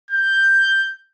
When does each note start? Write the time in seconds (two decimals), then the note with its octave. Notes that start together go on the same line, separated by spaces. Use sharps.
0.11 G6